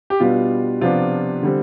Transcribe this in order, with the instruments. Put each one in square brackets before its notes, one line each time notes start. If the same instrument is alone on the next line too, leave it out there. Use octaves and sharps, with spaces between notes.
[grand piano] G4
B2 G3 B3 D4 F4
C3 F3 B3 D4 F4
D3 G3 C4